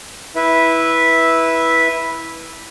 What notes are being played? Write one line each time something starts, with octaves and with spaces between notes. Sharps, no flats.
E4 B4 E5